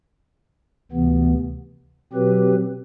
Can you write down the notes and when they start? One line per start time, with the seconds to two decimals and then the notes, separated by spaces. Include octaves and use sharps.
0.92 D2 C3 E3 B3
2.13 B2 F#3 C4 G4 B4